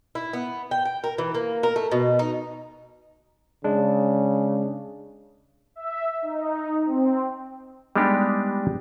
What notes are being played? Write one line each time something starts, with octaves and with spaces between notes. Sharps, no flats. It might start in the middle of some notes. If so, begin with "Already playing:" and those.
E4
B3
G5
G5
A#4
E3
A#3
A#4
A3
B2
D#4
C#3 G#3 D4
E5
D#4
C4
G3 G#3 B3 D4 D#4 G4